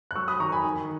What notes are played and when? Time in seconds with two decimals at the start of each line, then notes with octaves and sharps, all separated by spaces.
0.11 F#6
0.16 F#3 C#6 E6
0.28 B5 D#6
0.40 D#3 A#5 C#6
0.52 G#5 B5
0.64 D#3